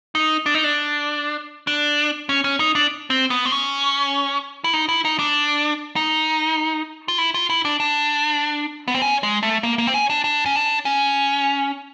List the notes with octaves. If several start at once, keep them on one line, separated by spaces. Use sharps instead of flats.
D#4
D4
D#4
D4
D4
C#4
C#4
D#4
D4
C4
B3
C4
C#4
E4
D#4
E4
D#4
D4
D#4
F4
E4
F4
E4
D4
D4
B3
C4
C#4
G#3
A3
A#3
A#3
C4
C#4
D4
D4
C#4
D4
C#4